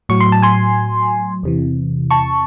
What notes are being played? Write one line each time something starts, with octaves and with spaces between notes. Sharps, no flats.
A2 F#3 C#6
C6
A5
G#5 C6
E2 C3 E3
A5 C#6